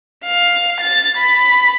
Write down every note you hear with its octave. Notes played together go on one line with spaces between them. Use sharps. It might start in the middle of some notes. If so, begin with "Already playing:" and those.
F5
A6
B5